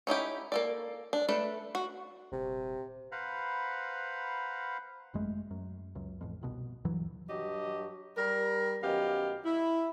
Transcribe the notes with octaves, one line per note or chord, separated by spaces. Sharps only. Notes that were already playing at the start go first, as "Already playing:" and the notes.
C#4 D#4 E4 G4
A#3 A4 D5
D4
A3 D4 A4 B4
F#4
D#1 C3
B4 C5 F5 F#5 A#5 B5
G#1 F#2 G#3 A3
F#2
C#2 F#2
A1 F2
G1 C2 B2
D2 G2 E3 F#3
G2 F#3 G4 D#5
G3 A#4
F#2 D#3 B3 G4 F5
E4